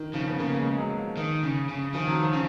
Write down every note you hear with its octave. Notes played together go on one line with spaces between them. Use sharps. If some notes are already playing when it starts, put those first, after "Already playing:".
Already playing: D#3
C#3 F3
B3
C#3 A#3
A#3
G#3
G#3
F#3
F3
D#3
C#3
C#3
D#3 F3
F#3
F3
C#3